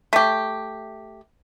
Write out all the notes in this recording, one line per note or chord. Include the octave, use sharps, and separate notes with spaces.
A3 G4